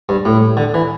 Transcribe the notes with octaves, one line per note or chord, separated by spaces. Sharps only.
G2
A2
D3
E3